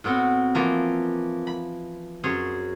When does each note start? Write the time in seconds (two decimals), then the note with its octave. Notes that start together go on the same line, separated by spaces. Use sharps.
0.04 A2 B3 C4 F#4
0.55 E3 F3 A#3
1.47 B5
2.24 F#2 G#4 C5 C#5